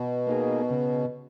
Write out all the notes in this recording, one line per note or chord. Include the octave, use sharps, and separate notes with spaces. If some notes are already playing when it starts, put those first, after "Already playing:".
Already playing: B2
A#3 D#4 G#4
C#3